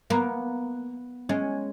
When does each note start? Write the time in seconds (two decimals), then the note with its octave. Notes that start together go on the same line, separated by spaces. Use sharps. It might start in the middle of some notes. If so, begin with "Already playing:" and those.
0.10 A#3 B3
1.29 G#3 C#4